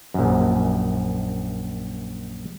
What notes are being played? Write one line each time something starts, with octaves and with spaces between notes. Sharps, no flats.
A#1 F#2